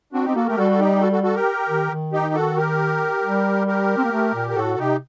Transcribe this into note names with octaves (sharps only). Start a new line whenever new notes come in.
C4 D4 F#4
C4 D#4 G4
A#3 F#4 A4
A3 G4 A#4
G3 F#4 A4
A4
D#4 G4
F#4 A4
F#4 A4
F#4 A4
G4 A#4
D#3
D#3
D#4 G4
F#4 A4
G4 A#4
G3
G4 A#4
C4
A#3
A3
A#2
A#4
A2 F#4 A4
C3 D#4 G4